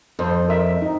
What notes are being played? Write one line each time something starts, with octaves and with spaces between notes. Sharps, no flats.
F2 A4 C5
A#4 E5
D#4